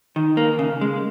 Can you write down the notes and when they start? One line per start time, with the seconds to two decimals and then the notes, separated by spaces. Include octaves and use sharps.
0.16 D#3
0.37 A#3
0.59 C#3
0.81 G#3